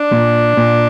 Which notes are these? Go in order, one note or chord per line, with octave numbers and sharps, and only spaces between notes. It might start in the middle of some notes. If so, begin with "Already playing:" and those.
Already playing: D4
A#2
A#2